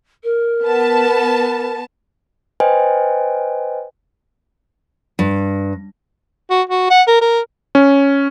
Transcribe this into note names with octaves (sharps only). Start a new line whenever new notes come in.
A#4
B3 A5
B4 C5 D#5 G5 G#5
G2
F#4
F#4
F#5
A#4
A#4
C#4